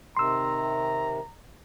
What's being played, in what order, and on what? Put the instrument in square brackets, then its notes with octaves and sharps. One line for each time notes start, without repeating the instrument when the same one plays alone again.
[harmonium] C3 D#3 [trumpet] A#5 [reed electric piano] C6 E6